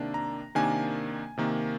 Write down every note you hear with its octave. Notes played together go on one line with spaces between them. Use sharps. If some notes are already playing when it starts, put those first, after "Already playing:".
Already playing: C3 D#3 A#3 D4
A#5
C3 D#3 A#3 D4 G#5
C3 D#3 A#3